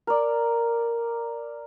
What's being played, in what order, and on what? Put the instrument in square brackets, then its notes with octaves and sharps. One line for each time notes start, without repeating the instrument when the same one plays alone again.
[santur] A#4 D5